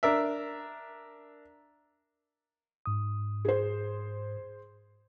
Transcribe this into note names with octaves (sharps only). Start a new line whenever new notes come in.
D4 A#4 E5
G#2 D#6
G#4 C5